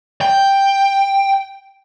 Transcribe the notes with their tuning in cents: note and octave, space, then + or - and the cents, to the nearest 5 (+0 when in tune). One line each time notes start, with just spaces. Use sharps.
G5 +5